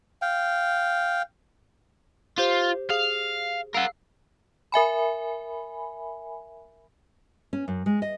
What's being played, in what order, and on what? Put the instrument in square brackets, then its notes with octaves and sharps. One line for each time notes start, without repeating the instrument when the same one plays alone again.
[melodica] F5 G5
[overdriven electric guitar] F4 [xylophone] G4 C5 G7
[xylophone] G#4 [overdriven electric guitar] F5
[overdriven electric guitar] A#4 F#5 [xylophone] F5 E6
[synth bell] A#4 E5 G#5 B5
[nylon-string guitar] C#4
F#2
G#3
D#5